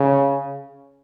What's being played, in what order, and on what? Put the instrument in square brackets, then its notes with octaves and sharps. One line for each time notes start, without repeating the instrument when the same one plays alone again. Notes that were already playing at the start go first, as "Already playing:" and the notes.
Already playing: [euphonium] C#3